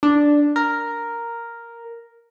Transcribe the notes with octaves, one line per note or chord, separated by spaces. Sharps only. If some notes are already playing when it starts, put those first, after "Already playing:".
D4
A#4